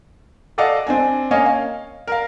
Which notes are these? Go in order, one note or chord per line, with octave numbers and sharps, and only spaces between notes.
A4 D5 D#5 F5 F#5
C4 D4 G#5
A#3 C#4 C#5 D#5 F5 G#5
F5
A#4 F5